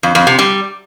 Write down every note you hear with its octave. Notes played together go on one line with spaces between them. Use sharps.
F2
F2
C3
G3